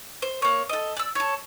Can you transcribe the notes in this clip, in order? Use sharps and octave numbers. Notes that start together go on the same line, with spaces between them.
C5
A#3 C#5
A4 D#5
D5 E6
A4 C#5